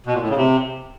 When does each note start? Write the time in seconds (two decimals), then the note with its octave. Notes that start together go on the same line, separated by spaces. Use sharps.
0.06 B2
0.14 A#2
0.22 A2
0.29 C#3
0.37 C3